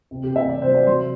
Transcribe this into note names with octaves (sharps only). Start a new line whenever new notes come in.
C3
G4
C3
E5
C3 D5
C5
F#3
D5
F#3 C6